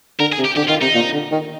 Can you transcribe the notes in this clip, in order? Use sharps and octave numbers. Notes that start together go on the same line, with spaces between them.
D3 A#4
G#4
C3
G4
D3 G4
D#3 F4
C3 D#4
A#2
D3
D#3